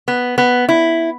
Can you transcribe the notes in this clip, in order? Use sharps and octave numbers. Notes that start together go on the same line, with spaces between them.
B3
B3
E4